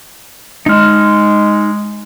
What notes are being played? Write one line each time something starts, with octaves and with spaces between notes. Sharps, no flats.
G#3 D#4 F6